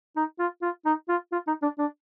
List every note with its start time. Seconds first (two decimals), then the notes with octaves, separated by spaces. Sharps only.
0.16 D#4
0.39 F4
0.62 F4
0.86 D#4
1.09 F4
1.32 F4
1.47 D#4
1.62 D4
1.79 D4